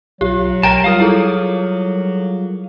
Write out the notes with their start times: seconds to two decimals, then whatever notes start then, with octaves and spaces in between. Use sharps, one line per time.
0.21 B1 F#3 F4 G4
0.63 B1 A#4 G5 A5 A#5
0.84 G3 F4 A#4 F5 D#6 F6
1.00 E4 G#4 A4